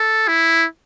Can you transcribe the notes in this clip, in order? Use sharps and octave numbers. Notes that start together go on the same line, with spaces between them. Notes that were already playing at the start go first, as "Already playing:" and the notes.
Already playing: A4
E4